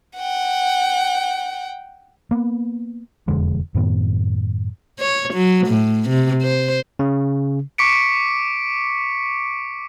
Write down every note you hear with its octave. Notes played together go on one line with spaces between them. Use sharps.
F#5 G5
A#3 B3
E1 F2 D3 G#3
F#2 A2 D#3 B3
C#5
F#3
A2
C3
C5
C#3
C#6 D6 B6 C#7 D7